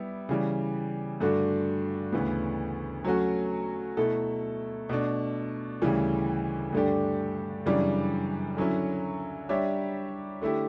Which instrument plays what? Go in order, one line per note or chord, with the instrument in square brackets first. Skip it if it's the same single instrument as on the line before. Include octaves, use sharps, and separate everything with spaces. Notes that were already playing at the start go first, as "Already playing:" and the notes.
Already playing: [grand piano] G3 B3 E4
C#3 E3 G3
G2 D3 A3 D4 F#4
D2 C#3 E3 B3
F#3 A3 C#4 F#4
B2 A3 E4 A4
B2 A3 D4
D2 C#3 E3 G3
G2 D3 A3 D4 G4
F#2 C#3 E3 G3 D4
D3 F#3 C#4 E4
G3 D4 G4 C#5 E5
D3 A3 E4 G4